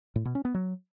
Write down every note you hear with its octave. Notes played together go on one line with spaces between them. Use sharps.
A2
B2
C#4
B3
F#3